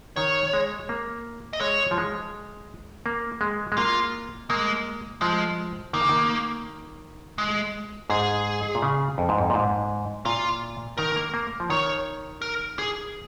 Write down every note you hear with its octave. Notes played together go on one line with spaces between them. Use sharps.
D#3 C#5
G#3
A#3
D#5
G#3 C#5
F3
G#3
A#3
G#3
G#3
A#3 F4
G#3 A#3
F3 G#3
D#3 A#3
C#3
D#3
G#3
G#2 G#4
A#2
C#3
F2
G#2
F2
A#2
G#2
A#2 F4
D#3 A#4
A#3
A#3
F3
D#3 C#5
A#4
G#4